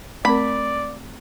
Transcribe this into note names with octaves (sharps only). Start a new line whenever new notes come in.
A3 C4 A#4 D5 B5